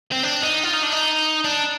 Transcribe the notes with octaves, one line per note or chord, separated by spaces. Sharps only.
C4
D4
D#4
F4
D#4
D4
D#4
D4